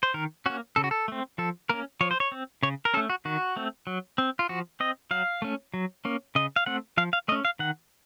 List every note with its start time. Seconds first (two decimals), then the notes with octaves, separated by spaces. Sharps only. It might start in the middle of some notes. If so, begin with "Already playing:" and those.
0.03 C5
0.14 D#3 A#4
0.46 A#3 C#4 F#4
0.76 C#3 A4
0.84 F#4
0.91 A4
1.08 A3 C4
1.38 F3 A4
1.69 A#3 C#4 A#4
2.01 F3 C#5
2.11 C5
2.20 C#5
2.32 C4
2.63 C#3 C#5
2.85 A#4
2.94 C#4 A4
2.97 A3
3.10 F#4
3.25 D#3 F#4
3.56 A3 C4
3.87 F#3
4.18 C4
4.39 F4
4.49 F3 F#4
4.80 C4 D#5
5.11 F#3 F5
5.42 A3 C#4
5.74 F#3
6.05 A#3 C#4
6.35 C#3 D#5
6.56 F5
6.66 A3 C4 F#5
6.97 F3 F5
7.13 F5
7.28 A3 D#5
7.32 C#4
7.45 F5
7.59 D#3 F#5